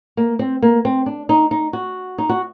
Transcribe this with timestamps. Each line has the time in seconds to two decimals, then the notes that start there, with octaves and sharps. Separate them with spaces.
0.17 A#3
0.39 C4
0.62 A#3
0.85 C4
1.06 D4
1.29 D#4
1.51 D#4
1.73 F#4
2.18 D#4
2.29 F#4